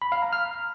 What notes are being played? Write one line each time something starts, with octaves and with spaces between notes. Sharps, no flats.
B5
F5
A#5
F6